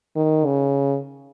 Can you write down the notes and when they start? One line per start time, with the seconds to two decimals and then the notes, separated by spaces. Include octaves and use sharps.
0.16 D#3
0.45 C#3